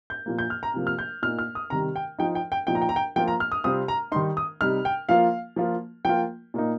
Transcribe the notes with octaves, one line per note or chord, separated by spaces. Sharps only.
G6
A#2 F3 A#3
G6
F6
A#5
C3 F3 A#3
F6
G6
A#2 A#3 D#4 F6
F6
D#6
C3 D#3 G3 A#5
G5
F3 D#4 G5
G5
G5
A#2 F3 D#4 G5
A#5
G5
A#5
G5
F3 A#3 F4 G5
A#5
F6
D#6
C3 G3 C4 F4 D#6
A#5
D#3 G3 D#4 C6
D#6
C3 G3 D#4 F6
G5
F3 A#3 F4 F5
F3 A#3 F4
F3 A#3 F4 G5
A#2 A#3 D#4